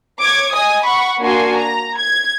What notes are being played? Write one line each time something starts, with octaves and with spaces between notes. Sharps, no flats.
C#5 D6 G#6
D#5 G#5 D#6
F#5 B5 C#6
A#3 D4 F#4 G#5 C6
A#5
G#6